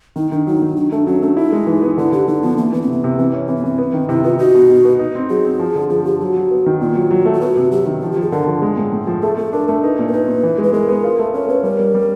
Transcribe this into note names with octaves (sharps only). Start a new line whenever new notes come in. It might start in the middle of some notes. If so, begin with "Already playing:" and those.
D#3 D#4
D#3 D4
F#3 D#4
D#3
F#3 D4
A3 D4
F#3 C#4
A3 D4
D#4 E4
G#3
E3
B3
D3 E4
D3 G4
D3 D#4
F3 B3
E3 A#3
E3 B3
C4
C3 B3
C3
E3 C4
C#4
E3 C4
B3
E3 C4
B3
D#3
C3 E4
B3 F4
D#4 F#4
B2
B2
B3
D#4
C4
F#3 G#4
C4
F3
D3
F3 G#4
F3 G4
F#3 F#4
F#3
B3
D#3
A#2 F4
F#3
F#3
A3
F4
B3 F#4
C3
F#3 G4
D#3
F3 F4
G4
F3 G#4
D3 A#4
F3
G#3
A2
A2
F3
A3 G#4
A3 A4
D4 A#4
A3 A#4
D#4 B4
A#2
A#4
D#4 B4
A#2
E3
G#3
B4
G#3 A#4
B3
F4
A3
C#4 A#4
C#4 B4
G3 A#4
G3
G3